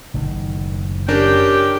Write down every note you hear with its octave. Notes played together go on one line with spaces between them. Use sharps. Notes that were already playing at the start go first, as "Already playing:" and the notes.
F#1 A2 D#3
C#4 D4 G4 A#4 G5